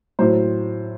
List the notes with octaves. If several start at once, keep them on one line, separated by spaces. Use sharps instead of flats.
A2 F#3 C5